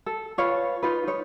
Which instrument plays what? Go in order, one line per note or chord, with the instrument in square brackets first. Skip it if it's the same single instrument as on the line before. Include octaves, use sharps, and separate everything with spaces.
[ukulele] A4
F4 B4 C#5 F5
D#4 F4 B4
D#4 C#5